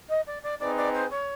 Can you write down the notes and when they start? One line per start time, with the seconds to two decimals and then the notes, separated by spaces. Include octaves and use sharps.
0.09 D#5
0.26 D5
0.43 D5
0.59 C4 D#4 G#4 B4 D5
0.77 D5
0.94 C5
1.10 C#5